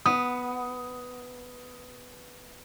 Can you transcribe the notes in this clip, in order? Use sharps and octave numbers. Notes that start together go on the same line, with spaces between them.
B3 D#6